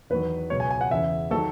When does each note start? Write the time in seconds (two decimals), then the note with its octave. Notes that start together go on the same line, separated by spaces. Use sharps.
0.10 E2 D#3 F#3 B4
0.50 C#2 B2 F#3 C#5
0.60 G#5
0.71 G#5
0.81 F#5
0.90 E2 C#3 E3 E5
1.31 D#3 F#3 A4